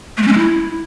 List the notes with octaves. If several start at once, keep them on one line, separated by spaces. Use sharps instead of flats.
A3
G#3
C#4
G#3
E4